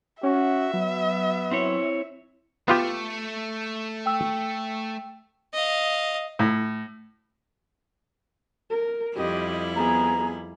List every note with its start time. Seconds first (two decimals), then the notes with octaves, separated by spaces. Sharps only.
0.23 C#4 F#4 E5
0.73 F#3 B3
1.51 C4 E4 C#5
2.68 A3 B3 F4 G4
4.06 G5 E6
5.54 D#5 F5
6.39 A2
8.70 A#4
9.16 F2 G3 E4 G4 D#5
9.76 B3 G#4 A#5